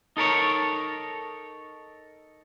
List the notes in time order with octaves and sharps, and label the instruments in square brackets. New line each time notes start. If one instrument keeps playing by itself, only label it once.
[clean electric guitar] D#4 A4 A#4 C#5